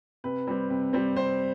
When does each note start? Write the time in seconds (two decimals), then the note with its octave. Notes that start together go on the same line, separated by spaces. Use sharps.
0.24 C3 B4
0.47 G3 C4
0.70 C3
0.93 G3 C4
1.16 C3 C5